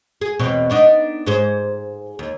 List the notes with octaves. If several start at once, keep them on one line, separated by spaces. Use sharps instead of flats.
G#4
E2 B2 C4
B3 D4 D#4
G#2 G#4 C5
D#2